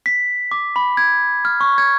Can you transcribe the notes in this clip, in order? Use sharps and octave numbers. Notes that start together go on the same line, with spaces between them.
B6
D6
B5
G#6
F6
C#6
G#6